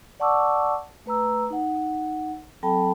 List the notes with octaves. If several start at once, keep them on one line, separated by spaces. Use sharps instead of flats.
D5 F#5 A5 C#6 D6 E6
A3 B4 A#5 E6
D#4 F#5
F#3 C4 A4 G5 A5 B5